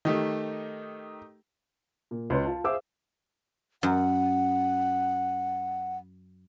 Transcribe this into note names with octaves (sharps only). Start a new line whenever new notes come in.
D#3 A3 D#4 G4
A#2
C#2 B4 C#5 C6
F4 A5
G#4 C5 E5 F5 D6 E6
F#2 F#5